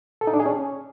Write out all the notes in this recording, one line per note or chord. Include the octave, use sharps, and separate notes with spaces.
A4
D#4
D4
G#4
C#4